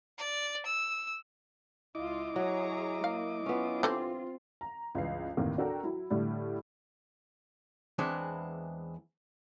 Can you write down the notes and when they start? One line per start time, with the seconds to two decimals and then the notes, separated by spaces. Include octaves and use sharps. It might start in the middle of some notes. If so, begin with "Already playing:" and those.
0.18 D5
0.65 E6
1.95 C#2 E4 F4 D#5 D6
2.36 F#3 G#4 C#5 A#5
3.04 A#3 F5
3.46 B3 C#4 F4
3.83 D3 E3 C4 G4
4.61 A#5
4.95 C#2 G2 E3 C7
5.37 G1 D#2 A2 C3 D#3
5.58 D4 F#4 A4 A#4 G5 A#5
5.83 F#3 E4
6.10 A2 D3 G3 A3
7.99 E2 E3 G#3 B3 C4 D4